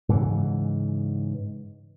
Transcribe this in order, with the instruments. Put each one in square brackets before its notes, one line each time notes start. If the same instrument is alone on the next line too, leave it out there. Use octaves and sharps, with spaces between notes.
[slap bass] G#2 C#3 E3